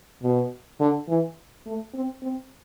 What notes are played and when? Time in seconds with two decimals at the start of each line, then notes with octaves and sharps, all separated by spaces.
0.23 B2
0.80 D3
1.09 E3
1.66 A3
1.94 C4
2.23 C4